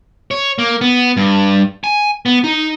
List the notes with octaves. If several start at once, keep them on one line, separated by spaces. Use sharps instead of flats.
C#5
A#3
B3
G2
G#5
B3
D#4